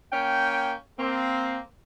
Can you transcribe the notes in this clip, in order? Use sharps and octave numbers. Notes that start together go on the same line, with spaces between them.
A#3 C#4 G5
A#3 C4